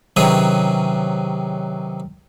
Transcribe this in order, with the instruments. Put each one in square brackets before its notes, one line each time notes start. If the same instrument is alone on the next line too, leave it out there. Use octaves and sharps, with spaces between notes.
[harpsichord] C3 D#3 F#3 C#4 G#4 B4